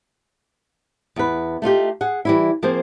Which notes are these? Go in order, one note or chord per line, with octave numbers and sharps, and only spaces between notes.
E2 B4
A3 D#4 F4 G4
G#4 F#5
E3 G3 E4
F3 A#3 C4 G#4 C5